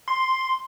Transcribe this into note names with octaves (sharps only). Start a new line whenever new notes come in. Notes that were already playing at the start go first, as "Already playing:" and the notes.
C6